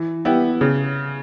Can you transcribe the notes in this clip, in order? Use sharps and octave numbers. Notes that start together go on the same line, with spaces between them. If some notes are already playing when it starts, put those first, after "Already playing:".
Already playing: E3
B3 E4 G4
C#3